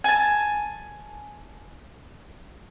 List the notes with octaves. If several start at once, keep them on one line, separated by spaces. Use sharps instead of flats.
G#5 A5